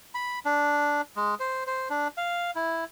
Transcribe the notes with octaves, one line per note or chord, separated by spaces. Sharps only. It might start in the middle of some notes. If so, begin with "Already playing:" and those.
B5
D4
G#3
C5
C5
D4
F5
E4